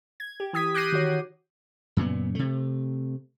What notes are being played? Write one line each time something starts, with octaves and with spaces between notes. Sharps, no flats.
G#6
G4
E3 G4 D#6 G#6 B6
D6 F#6 G6 A#6 C7 D#7
D#3 F#4 C#5
F#2 A#2 C#3 B3
C3 A3